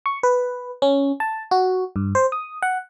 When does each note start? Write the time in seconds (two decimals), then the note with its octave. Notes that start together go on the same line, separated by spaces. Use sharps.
0.06 C#6
0.23 B4
0.82 C#4
1.20 A5
1.51 F#4
1.96 G2
2.15 C5
2.32 D#6
2.62 F#5